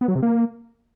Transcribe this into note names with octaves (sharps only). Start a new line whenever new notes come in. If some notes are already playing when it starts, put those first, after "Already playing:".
B3
F#3
C3
A#3